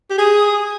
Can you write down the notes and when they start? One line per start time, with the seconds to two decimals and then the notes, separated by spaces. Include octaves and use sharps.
0.10 G4
0.18 G#4 D#6